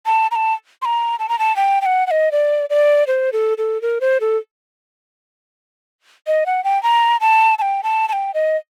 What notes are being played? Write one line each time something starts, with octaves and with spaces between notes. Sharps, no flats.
A5
A#5
A5
C6
A#5
A5
A#5
A5
G5
G5
F#5
F#5
D#5
D5
D5
C5
A4
A4
A#4
C5
A4
D#5
F#5
G5
A#5
A5
A5
G5
A5
A5
G5
D#5